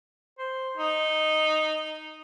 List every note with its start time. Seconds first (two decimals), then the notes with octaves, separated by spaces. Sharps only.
0.38 C5
0.77 D#4